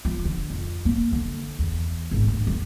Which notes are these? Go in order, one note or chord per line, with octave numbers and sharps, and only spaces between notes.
F3
D3
F2
A#3
D3
E2
G#1
D1
F#2